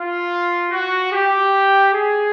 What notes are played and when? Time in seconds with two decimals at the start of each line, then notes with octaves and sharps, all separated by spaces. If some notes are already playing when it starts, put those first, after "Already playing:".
Already playing: F4
0.71 F#4
1.12 G4
1.93 G#4